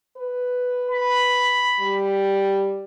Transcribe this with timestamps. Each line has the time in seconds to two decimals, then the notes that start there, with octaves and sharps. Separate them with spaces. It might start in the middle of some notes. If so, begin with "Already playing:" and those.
0.17 B4
0.90 B5
1.80 G3